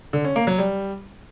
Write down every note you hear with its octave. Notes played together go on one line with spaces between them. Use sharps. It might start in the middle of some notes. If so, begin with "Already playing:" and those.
D3
C#4
A#3
F#3
G3